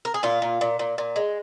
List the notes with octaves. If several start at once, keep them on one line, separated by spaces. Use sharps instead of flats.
A#4
G#4
A#2 F4
A#2
A#2
A#2
A#2
G#3